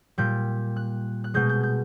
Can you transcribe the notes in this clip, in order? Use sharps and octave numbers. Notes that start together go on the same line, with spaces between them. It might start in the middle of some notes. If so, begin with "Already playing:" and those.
A#2 G3 G6
F#6
F#6
B2 G#3 G6
G6
G6